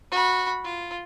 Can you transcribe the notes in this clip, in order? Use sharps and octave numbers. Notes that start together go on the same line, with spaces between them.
F#4 B5
F4